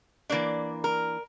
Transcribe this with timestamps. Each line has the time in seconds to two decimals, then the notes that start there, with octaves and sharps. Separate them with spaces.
0.29 E3 A#3 D4 D5
0.84 A#4